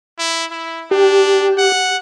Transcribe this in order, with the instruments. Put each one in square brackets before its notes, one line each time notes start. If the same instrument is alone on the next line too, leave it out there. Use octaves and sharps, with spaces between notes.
[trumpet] E4
E4
[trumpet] D4 [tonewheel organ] G4
[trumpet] F#5